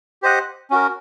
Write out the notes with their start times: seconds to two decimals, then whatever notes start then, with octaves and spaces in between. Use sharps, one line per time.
0.22 G4 C5 D#5 F#5
0.70 C#4 F#4 A#4